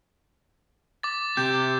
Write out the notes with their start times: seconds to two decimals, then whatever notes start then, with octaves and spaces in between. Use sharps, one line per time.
1.03 D6 A6
1.37 C3 G4 G6